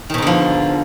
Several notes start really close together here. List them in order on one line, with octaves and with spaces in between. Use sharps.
D#3 B2 G#2 D3 F3